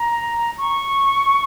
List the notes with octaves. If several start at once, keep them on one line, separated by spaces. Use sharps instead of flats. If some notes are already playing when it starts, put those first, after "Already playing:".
Already playing: A#5
C#6